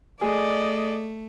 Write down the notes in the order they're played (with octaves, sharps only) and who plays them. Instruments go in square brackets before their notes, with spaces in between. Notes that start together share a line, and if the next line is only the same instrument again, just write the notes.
[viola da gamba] A3 [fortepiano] G#4 [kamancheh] D5 D#5